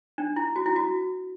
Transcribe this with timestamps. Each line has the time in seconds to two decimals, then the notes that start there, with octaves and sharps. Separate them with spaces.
0.18 D4
0.36 E4
0.56 F#4
0.66 E4
0.76 F#4